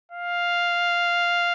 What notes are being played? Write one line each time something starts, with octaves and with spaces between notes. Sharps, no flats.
F5